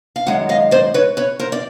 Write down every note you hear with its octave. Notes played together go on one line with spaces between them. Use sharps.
F5
F#2 D#3 G#3 F#5
D#5 F5
C5 D5
B4 C#5
B4 C#5
A#4 C5
D5